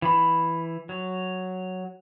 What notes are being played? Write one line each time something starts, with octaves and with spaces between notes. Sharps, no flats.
E3 B5
F#3